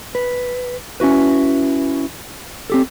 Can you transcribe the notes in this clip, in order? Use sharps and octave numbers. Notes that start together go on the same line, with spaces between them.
B4
C#4 E4 F#4 B4
C4 G4 A4